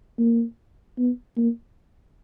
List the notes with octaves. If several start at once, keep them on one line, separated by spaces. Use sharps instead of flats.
A#3
B3
A#3